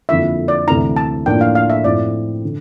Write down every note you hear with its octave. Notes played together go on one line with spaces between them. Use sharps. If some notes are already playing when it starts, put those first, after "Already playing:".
F2 D3 F3 A#3 E4 E5
D5
D2 C3 E3 A#5
A5
A2 F3 A#3 D4 G5
F5
F5
E5
A2 F3 C4 F4 D5
D3